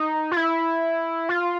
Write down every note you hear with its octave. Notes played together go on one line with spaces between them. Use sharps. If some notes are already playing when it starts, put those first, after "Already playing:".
Already playing: D#4
F4
E4
F4